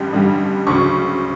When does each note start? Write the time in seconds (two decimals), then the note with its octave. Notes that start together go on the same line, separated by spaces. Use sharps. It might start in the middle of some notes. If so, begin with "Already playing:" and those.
Already playing: A1 G2 D3 G3
0.13 A1 G2 D3 G3
0.67 D2 C#3 F#3 C#6